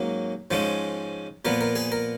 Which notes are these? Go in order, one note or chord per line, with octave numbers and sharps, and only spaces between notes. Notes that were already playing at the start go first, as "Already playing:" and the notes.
Already playing: G#2 F#3 A#3 C#4
G#2 F3 G#3 C#4
A#2 F3 B3 A#4
A#4
G#4
A#4